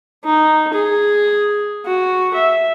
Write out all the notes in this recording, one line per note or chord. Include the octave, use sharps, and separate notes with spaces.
D#4
G#4
F#4
E5